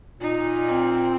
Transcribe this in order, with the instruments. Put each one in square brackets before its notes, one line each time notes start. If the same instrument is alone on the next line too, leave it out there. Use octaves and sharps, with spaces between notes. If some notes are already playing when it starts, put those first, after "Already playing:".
[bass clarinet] A#2 [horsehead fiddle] D#4
[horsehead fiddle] C4